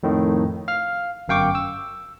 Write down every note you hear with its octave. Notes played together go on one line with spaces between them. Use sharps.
F2 A2 D#3
F5 F6
G1 F#2 F5 G5 C#6 D6
E6